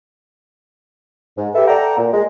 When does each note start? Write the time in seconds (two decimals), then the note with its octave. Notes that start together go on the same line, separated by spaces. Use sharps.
1.38 G#2
1.54 G4 A4 B4 E5
1.68 A4 D5 F#5 G5 A#5
1.98 A#2
2.13 G#3